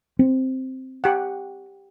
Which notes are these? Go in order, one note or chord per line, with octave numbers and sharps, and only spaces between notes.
C4
G4 F#5